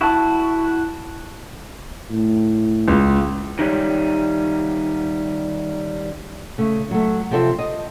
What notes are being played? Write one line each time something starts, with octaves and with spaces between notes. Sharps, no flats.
E4 F#4 A5 D#6
A2
C#2
D#3 G3 C#4
C#3 A3
F#3 A3
C3 F3 C4 A4 C5 E5
D#5